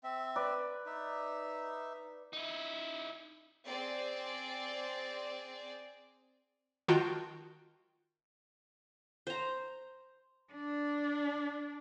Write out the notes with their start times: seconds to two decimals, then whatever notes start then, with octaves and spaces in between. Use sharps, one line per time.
0.04 C4 E5
0.36 B4 D5
0.86 D#4 E5
2.33 D#4 E4
3.65 C4 G#4 D5
6.88 D#3 F4 F#4 G5 A5 G6
9.27 C5 A#5
10.53 D4